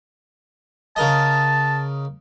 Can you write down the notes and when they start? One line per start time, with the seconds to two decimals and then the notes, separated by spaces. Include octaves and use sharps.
0.96 C#3 A#4 D#5 A5